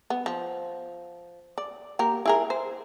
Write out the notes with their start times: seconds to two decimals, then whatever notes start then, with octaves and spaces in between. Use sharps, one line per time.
0.10 B3
0.26 F3
1.58 D5
1.99 A#3 G4 A#4
2.26 E4 G#4 A#4
2.50 C5